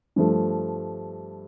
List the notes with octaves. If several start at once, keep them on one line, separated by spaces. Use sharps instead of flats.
G2 F3 A3